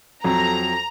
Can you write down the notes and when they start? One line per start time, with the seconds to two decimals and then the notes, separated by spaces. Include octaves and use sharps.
0.24 F2 F#3 A4 A#5